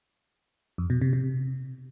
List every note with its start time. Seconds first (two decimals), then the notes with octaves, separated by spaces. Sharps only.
0.78 F2
0.90 B2
1.01 C3
1.13 C3